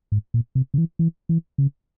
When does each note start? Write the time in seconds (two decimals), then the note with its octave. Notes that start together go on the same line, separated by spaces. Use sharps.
0.12 G#2
0.34 A#2
0.55 C3
0.74 C#3
0.78 E3
0.99 E3
1.29 E3
1.58 C#3